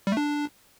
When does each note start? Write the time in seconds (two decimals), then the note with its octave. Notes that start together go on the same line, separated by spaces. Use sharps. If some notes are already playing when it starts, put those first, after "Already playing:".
0.07 G3
0.12 A3
0.17 D4